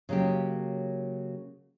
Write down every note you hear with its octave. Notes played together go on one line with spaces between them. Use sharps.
C#3 F#3 G#3 A#3 G4